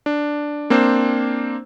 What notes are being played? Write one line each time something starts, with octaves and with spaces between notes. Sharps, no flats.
D4
A#3 C4 D4 C5